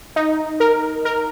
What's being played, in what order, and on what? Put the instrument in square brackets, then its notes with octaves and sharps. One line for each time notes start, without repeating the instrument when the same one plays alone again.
[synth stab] D#4
A#4
A#4